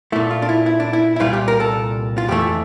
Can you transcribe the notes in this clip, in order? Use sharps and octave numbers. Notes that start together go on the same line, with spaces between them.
A#2 A3 E4
F4
D4
E4
E4
D4
E4
E4
C2 A#2 G3 F4
G4
A#4
A4
F4
F2 E3 A3 G4